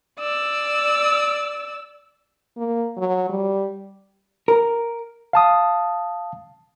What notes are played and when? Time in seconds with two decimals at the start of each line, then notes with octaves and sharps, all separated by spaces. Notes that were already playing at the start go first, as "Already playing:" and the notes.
0.20 D5 E6
2.57 A#3
2.98 F#3
3.30 G3
4.48 A#4
5.33 F5 A5 D#6